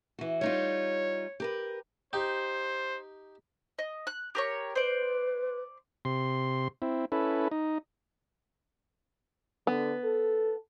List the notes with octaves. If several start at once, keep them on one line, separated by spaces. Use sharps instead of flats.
E3 F#4
G3 D#4 F4 C#5
G4 A#4 B4
D#4 G4 C5
D#5
F#6
G4 A#4 C#5
B4 C5 D5
C3 C6
C4 E4
C#4 E4 A4 B4
D#4
D3 B3
A4